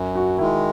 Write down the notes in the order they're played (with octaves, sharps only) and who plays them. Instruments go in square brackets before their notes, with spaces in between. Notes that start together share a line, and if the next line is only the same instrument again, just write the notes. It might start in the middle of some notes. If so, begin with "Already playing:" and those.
Already playing: [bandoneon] F#2
[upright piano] F#4
[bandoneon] D#3 G#3 [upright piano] E4